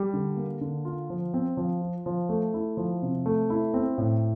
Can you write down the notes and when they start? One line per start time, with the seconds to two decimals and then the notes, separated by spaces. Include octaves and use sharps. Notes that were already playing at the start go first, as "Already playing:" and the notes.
Already playing: G3
0.13 D3
0.37 A#3
0.61 D3
0.85 F4
1.10 F3
1.34 C4
1.57 F3
1.81 F4
2.06 F3
2.29 A3
2.54 E4
2.77 F3
3.02 C3
3.26 A3
3.50 E4
3.74 C4
3.98 A2